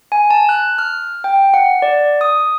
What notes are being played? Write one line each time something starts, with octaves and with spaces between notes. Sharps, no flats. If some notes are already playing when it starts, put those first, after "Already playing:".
G#5
A5
F#6
F6
G5
F#5
D5
D#6